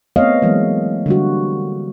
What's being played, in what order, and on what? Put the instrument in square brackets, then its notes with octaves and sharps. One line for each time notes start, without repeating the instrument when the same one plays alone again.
[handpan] A3 B3 C4 C#5 D#5 F5
E3 F#3 G#3 A#3
D3 G3 F#4